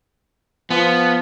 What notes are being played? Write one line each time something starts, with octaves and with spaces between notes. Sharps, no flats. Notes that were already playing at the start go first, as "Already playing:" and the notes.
F3 B3